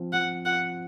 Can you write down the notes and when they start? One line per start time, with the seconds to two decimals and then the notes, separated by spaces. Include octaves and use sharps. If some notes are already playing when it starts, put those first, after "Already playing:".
Already playing: F3 C4
0.13 F3 F#5
0.45 F4 F#5